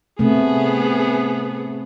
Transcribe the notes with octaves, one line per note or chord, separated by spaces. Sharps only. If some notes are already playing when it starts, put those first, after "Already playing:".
C3 A3 B3 G#4